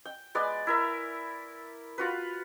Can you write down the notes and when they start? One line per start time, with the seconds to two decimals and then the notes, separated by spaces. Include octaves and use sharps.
0.05 G5
0.35 G#3 B3 D5
0.67 E4 A#4 E5
1.98 F4 F#4 B4